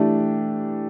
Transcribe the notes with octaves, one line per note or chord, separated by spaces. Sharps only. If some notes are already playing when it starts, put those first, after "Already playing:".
Already playing: E3 A3 D4 G4